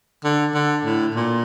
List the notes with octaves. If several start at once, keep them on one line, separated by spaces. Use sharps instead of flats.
D3
D3
A2
A#2